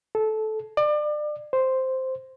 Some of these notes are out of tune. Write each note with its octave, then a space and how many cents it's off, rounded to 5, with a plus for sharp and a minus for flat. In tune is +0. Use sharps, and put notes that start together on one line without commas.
A4 -15
D5 +30
C5 +0